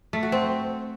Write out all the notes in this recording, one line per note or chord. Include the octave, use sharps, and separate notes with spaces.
A3
F#4
C4